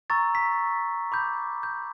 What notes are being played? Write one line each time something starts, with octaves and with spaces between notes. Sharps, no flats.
A#5 C#6 E6 A6
B6
B5 D6 G6
G6